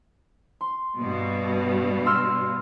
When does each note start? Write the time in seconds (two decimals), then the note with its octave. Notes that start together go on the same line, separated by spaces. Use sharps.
0.61 C6
1.00 G2 B2
2.06 C6 E6 F6